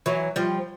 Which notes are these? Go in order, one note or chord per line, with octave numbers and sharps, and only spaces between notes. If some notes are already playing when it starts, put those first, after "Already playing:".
E3 F#3
F3 G3